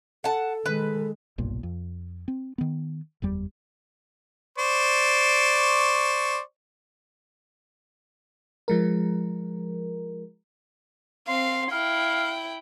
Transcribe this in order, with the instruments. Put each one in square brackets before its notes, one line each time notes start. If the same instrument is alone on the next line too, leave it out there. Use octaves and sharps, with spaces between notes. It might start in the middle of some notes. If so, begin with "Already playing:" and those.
[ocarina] A4 [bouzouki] F#5 A5
[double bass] D#3 G#3 [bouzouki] B4
[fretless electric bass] F#1 B1 G2 A#2
F2
C4
D#3 B3
F#1 E2 G3
[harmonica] C5 D5 C#6
[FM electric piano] F3 G#3 A#4
[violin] C4 F5 [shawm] C6
[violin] E4 G5 [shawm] F5